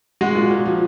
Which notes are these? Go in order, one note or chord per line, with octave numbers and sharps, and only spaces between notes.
G#3 F#4
A#2
A#2
F3